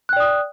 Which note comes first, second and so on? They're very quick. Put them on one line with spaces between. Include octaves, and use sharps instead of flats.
F#6 G5 D5 D#6